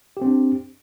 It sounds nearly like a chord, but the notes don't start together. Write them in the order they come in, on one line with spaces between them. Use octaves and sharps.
G4 C4 D4